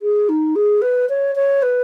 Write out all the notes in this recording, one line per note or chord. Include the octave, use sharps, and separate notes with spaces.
G#4
D#4
G#4
B4
C#5
C#5
B4